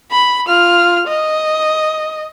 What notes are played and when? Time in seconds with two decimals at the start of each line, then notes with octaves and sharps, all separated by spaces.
0.11 B5
0.48 F4 F6
1.07 D#5